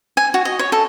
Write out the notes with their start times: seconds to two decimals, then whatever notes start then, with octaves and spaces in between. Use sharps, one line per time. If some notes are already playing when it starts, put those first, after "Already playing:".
0.17 G#5
0.34 F#4
0.45 D#5
0.59 C#5
0.72 A4